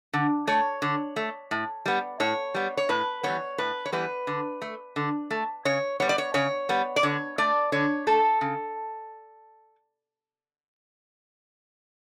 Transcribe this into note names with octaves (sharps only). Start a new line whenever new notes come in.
D3
A3 C#5
D3
A3
A2
G3 B3
A2 C#5
G3 B3
C#5
A2 B4
E3 G3 B3 C#5
A2 B4
C#5
E3 G3 B3 B4
D3
A3
D3
A3
C#3 C#5
G3 B3 C#5
D5
C#5
C#3 C#5
G3 B3
D5
D3 C#5
A3 D5
D3 C#5
A3 A4
C#3